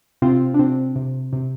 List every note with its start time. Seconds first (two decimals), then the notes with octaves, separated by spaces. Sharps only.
0.22 C3 C4 F4
0.54 D4
0.59 C3 C4
0.96 C3
1.33 C3